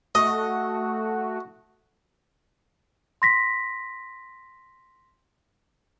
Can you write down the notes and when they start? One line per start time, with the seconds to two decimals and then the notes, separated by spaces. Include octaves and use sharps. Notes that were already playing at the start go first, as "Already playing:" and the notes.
0.15 A3 F#4 D#5
3.22 C6 A#6 B6